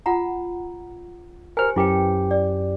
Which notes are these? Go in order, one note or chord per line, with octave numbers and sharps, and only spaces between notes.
F4 F#5 A#5
G4 A#4 C5 G#5 F6
F#2 E4 G4 B4 G5
D5